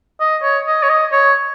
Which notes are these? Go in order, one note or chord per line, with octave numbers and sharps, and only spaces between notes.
D#5
C#5
D#5
C#5
D#5
C#5